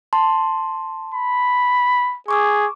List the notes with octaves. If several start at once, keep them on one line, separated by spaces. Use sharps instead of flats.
A5 C6
B5
G#4 C#6 D6 E6